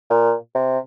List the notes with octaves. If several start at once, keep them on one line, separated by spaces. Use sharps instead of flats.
A#2
C3